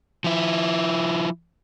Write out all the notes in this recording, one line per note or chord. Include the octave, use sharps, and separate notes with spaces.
F3 E4